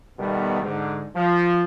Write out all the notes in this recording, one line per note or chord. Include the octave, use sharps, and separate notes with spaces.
B2 D#3 G3 A3 B3 D#4
G#2 D3
F3